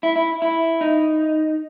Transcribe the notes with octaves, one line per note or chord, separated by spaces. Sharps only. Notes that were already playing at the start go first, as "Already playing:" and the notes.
E4
E4
E4
D#4